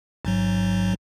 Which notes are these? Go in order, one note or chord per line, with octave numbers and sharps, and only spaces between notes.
A1 G#2 F#3